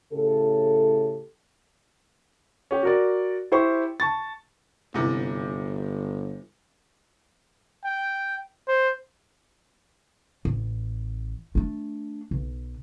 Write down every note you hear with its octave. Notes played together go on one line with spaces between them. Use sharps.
A2 C#3 G4 A4
C#4 G4
F#4 A#4 D5
E4 G4 C5 C#6
A5 C#6 A6
G1 G#2 C3 E3
G5
C5
A1
A3 D4
B1